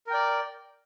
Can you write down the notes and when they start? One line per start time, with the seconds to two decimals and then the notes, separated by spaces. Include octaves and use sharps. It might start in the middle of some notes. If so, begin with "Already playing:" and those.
0.07 A#4
0.10 G5
0.14 D5